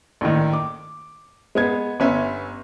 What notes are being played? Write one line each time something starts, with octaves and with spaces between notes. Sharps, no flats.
A#1 A2 D#3
D6
G#3 B3 G#6
G1 B3 C#4 E5